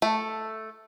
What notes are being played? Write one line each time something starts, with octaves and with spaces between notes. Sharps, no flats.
A3